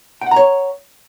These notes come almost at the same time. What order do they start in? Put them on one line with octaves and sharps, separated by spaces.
G5 F#5 A#5 C#5